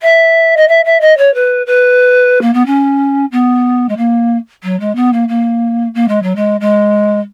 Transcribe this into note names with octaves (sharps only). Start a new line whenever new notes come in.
E5
D#5
E5
E5
D#5
C#5
B4
B4
A#3
B3
C#4
B3
G#3
A#3
F#3
G#3
B3
A#3
A#3
A#3
G#3
F#3
G#3
G#3